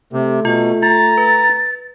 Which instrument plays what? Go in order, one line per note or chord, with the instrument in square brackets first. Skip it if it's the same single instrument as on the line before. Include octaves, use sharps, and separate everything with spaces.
[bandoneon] C3 [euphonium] A3
[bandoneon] B2 [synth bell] F4
[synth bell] F4 [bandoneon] A#5 [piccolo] A6
[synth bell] B4